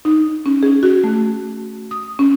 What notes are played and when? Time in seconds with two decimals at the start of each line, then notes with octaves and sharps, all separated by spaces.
0.05 D#4
0.46 C#4
0.63 G#4
0.83 F#4
1.04 A3
1.91 D#6
2.19 C#4